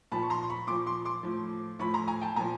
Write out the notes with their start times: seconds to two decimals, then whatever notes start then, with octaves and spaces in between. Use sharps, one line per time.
0.12 A#2 F3 A5 B5
0.23 C#6
0.30 A#5 C6
0.43 C6
0.50 B5 C#6
0.67 A#2 F3 C6 D6
0.86 C6 D6
1.05 C6 D6
1.23 A2 F3
1.79 A2 F3 B5 C#6
1.94 A#5 C6
2.08 G#5 A#5
2.21 G5 A5
2.36 A#2 F3 G#5 A#5